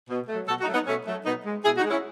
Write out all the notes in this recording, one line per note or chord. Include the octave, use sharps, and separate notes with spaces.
B2
F#3 A3
B2 F#4 A4
D#4 F#4
F#3 A3
B3 D#4
B2 A3 C#4
F#3 A3
B2 B3 D#4
G#3
B2 E4 G#4
D#4 F#4
G#3
C#4 E4